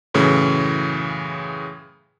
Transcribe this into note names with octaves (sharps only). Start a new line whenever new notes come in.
F#2 A2 C#3 E3